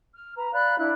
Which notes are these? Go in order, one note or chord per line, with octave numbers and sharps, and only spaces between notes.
F6
B4 A#5
D5 F5 B5 F#6
D4 E4 F#6